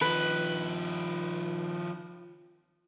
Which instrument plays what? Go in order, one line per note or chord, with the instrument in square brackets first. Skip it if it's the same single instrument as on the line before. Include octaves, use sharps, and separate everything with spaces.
[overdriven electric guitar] D#3 F3 [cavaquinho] B4